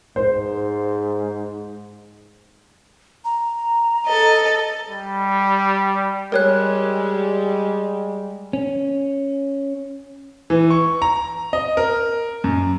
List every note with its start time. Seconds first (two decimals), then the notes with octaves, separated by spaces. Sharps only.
0.16 G#2 C5
3.25 A#5
4.06 A4 D#5
4.90 G3
6.32 G3 G#3 A#4 C#5 F#6
8.53 C#4
10.50 E3
10.70 C#6
11.02 A#5
11.53 D#5
11.77 A#4
12.44 F#2